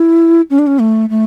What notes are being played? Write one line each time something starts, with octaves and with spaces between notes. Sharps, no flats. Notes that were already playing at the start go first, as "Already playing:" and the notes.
Already playing: E4
C#4
D4
C#4
A3
A3